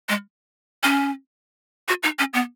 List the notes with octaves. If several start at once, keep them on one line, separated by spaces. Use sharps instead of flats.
G#3
C#4
F#4
D#4
C#4
B3